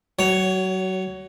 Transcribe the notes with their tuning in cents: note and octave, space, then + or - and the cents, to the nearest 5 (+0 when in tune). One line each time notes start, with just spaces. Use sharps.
F#3 +25 C#5 +0